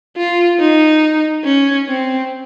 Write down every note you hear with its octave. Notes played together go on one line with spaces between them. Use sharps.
F4
D#4
C#4
C4